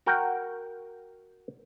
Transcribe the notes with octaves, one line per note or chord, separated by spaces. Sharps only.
F#4 A#4 F#5 G5